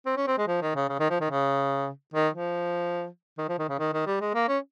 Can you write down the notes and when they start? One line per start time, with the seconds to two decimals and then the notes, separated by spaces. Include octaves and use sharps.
0.06 C4
0.17 C#4
0.27 C4
0.38 G#3
0.48 F3
0.62 D#3
0.75 C#3
0.89 C#3
0.99 D#3
1.10 F3
1.21 D#3
1.31 C#3
2.14 D#3
2.34 F3
3.38 D#3
3.48 F3
3.59 D#3
3.69 C#3
3.79 D#3
3.94 D#3
4.06 G3
4.21 G#3
4.34 A#3
4.48 C#4